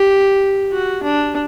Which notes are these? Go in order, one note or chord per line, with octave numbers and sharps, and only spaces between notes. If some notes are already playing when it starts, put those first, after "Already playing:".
Already playing: G4
F#4
D4